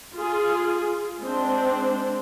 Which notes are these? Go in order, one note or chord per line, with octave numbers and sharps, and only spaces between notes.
F4 G#4
G#3 C4 D4 C5